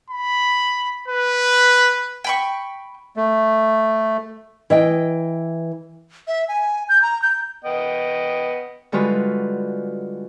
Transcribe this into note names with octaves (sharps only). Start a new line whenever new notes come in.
B5
B4
G5 B5 C#6
A3
E3 D#5 G5
E5
G#5
G6
A#5
G6
B3 D#5 G5
D3 G3 G#3 F4 F#4 B4